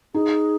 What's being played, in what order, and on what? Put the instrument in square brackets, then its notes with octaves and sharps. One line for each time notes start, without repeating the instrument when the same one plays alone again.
[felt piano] D#4 [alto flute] G#4